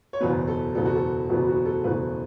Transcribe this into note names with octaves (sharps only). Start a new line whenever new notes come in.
C#5
F#1 E2 B2 B3 B4
A4
F#1 E2 B2 B3 A4
F#4
A4
F#1 E2 B2 B3 F#4
F#4
A4
F#1 E2 B2 B3 B4